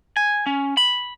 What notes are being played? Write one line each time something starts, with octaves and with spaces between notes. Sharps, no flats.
G#5
C#4
B5